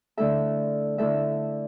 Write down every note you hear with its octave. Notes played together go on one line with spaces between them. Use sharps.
D3 A3 E4 A4 E5
D3 A3 E4 A4 E5